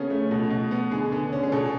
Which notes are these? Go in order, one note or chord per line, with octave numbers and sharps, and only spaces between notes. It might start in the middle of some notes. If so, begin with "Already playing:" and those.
Already playing: C#3 B3 C#4 A4
A3
B2
B2
B3
D3 G#4
D3
C#4
G#4
B2 A4